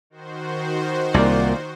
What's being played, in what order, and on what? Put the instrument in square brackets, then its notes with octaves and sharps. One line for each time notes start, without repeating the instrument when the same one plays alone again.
[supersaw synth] D#3 F#4 C5
[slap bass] C2 [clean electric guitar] A#3 F4 D5